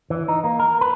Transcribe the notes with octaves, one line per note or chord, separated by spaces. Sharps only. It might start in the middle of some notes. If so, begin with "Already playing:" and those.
E3
D#4
A#3
A#4
B4